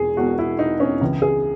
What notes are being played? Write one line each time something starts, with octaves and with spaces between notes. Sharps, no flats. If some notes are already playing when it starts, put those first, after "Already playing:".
Already playing: E1 E2 G#4
E1 E2 B2 F#4
E4
D#4
C#4
C#2 C#3 E3
G#4